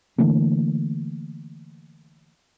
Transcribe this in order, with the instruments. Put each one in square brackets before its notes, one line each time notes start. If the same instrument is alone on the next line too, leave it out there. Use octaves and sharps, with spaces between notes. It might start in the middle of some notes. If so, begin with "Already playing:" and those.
[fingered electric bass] D3 E3 A3 A#3